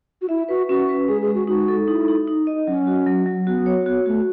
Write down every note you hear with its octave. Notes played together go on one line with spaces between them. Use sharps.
F#4
E4 E5
F#4 B4
C#4 F#4
B4
G#3 G#4
G#4
G#3
F#4
D#4 F#4
A4
D#4 E4
D#4
D#4
D#5
F#3 C#4
F#4
F#3
F#3
B3 F#4
C#5
B3 F#4
A3 F#4